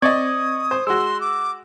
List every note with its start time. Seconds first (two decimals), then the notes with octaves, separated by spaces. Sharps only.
0.02 C4 D5 D#5 C#6 D#6 G#6
0.71 C5
0.87 G#3 F#4 C6 E6
1.21 D6